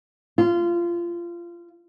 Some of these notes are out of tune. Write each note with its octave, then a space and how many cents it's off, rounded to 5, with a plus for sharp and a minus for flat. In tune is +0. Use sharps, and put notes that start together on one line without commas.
F4 -20